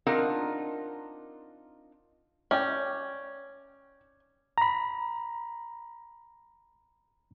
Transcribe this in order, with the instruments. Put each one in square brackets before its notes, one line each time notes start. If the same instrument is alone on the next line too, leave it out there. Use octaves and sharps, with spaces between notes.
[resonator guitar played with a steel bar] C4 D4 D#4 F4 A#4 F#5
[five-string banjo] C#4 [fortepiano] D5 G5
[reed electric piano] A#5 B5